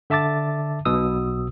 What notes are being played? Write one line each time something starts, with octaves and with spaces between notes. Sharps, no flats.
D3 E5 A5 D6 A6
B1 B2 D#6 E6